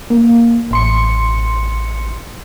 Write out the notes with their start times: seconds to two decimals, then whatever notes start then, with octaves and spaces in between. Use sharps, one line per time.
0.10 A#3
0.71 A1 C6 C#7